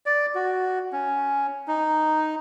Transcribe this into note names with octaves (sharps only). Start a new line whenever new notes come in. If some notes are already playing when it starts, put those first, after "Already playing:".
D5
F#4
C#4
D#4